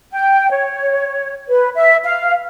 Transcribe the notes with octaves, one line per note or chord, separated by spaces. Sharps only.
G5
C#5
B4
E5
F5